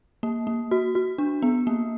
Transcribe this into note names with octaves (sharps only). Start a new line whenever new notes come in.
A#3
A#3
F#4
F#4
D4
B3
A#3